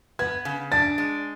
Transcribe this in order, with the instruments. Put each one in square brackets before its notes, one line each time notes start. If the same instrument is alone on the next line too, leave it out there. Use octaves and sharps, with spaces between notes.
[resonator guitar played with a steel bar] B3 [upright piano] G#6
[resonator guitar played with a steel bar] C#3
[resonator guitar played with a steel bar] D4 [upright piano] A6
[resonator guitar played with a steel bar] G#3